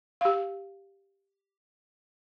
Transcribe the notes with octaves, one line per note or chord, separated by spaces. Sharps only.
G4 F5